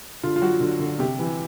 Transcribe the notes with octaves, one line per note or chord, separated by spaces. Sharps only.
D3 F4
F4
F#3 F#4
D3
D3
C3 G4
E3